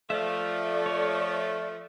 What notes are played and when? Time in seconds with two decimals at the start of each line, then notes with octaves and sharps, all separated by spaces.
0.10 F3 A3 D5 E5 F5
0.86 C#5